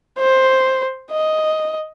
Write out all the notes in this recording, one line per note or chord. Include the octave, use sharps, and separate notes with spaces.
C5
D#5